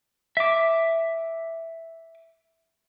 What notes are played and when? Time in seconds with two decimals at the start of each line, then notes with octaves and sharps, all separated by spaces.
0.37 E5 D6